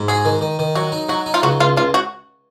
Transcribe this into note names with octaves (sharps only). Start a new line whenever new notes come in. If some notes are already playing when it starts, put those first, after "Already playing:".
Already playing: G#2
F#4 G#4
D#3
D#3
D#3
F#3 F#4
D#4
F#3 F#4
D#4
F4
C#2 F#4
C#2 F4
C#2 F4
F#4